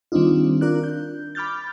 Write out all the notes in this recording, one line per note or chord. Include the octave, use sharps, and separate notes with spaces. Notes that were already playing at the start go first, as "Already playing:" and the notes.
D#3 G3 C4 D4 D#4 F4
D4 F4 A#4 D5 F#6
G6
B5 D6 F6 G6 A6